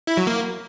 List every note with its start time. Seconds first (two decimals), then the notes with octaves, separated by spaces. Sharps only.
0.07 E4
0.17 F#3
0.27 A#3